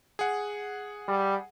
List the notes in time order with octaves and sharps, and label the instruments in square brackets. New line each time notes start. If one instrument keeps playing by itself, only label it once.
[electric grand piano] G#4 F#5
[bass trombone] G3